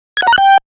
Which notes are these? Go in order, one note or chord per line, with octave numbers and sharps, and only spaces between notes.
G#6
F#5
A#5
F#6
G5